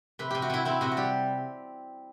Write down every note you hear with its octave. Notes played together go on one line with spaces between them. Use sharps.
C3 B4
C3 G4
F#4
C3 E4
C4 E4
C3 F#4
F#4
G3 G4